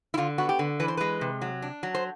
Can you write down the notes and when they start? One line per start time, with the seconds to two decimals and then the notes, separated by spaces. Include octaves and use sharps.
0.14 E4
0.17 D3 F4
0.38 B3 F#4
0.49 G4
0.59 D3
0.80 E3 B4
0.88 C5
0.97 G#3 B4
1.21 C3
1.41 F#3
1.62 D4
1.83 F#3
1.95 C5